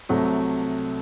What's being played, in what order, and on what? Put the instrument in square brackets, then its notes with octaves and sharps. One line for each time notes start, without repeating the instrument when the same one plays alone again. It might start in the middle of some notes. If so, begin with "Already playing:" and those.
[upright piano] C2 C3 F#3 A3